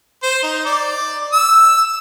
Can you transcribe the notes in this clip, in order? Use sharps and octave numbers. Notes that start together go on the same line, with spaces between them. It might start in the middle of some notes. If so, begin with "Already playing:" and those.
C5
D#4
D5
E6